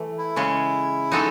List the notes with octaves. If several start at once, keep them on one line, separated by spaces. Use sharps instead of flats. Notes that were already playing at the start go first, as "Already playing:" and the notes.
Already playing: E3 A3
E4
C#3 G#3 C#4
G#3 D#4 F#4 A4